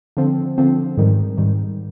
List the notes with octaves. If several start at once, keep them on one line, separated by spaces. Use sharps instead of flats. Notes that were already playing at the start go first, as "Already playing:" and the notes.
D3 F3 C4
D3 F3 C4
G#2 D#3 G3
G#2 D#3 G3